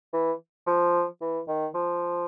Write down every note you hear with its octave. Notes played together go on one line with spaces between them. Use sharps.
E3
F3
E3
D#3
F3